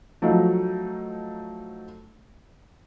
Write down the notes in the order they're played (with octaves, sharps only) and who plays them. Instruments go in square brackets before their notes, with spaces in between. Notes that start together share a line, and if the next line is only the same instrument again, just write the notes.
[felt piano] F3 F#3 A3 D#4